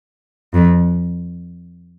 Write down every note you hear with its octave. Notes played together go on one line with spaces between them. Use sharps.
F2